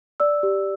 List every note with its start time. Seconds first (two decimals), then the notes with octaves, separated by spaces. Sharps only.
0.20 D5 E6
0.43 G4